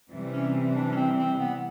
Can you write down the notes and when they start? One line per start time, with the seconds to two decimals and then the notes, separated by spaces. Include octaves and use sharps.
0.10 C3 E3 G3
0.32 C#4
0.76 D4
0.92 C#4
0.96 C4
1.18 C4
1.39 B3